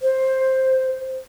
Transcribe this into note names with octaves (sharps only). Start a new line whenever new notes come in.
C5